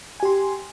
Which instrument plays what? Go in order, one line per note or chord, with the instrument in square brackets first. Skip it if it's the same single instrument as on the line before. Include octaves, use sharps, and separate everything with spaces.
[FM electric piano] G#5
G4
C6